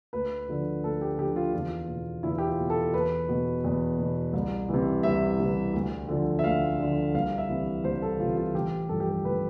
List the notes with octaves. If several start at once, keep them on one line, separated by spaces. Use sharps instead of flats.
D2 B4
D3 F3
D2 A4
G4
D3 F3 G4
F4
E2 F4
B2
E2 E4
G4
F4
B2
A4
E2 B4
B2
E2
B2
C2
C3 E3
C2 E5
C3 E3
D2
D3 F3
E5
D2 F5
D3 F3
C2 F5
E5
C3 E3
C2 C5
A4
C3 E3 F4
F4
A1 G4
G2 F3 A4
G4
A4
A1 B4